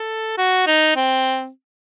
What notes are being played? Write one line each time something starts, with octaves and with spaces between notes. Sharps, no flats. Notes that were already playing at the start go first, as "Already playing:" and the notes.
Already playing: A4
F#4
D#4
C4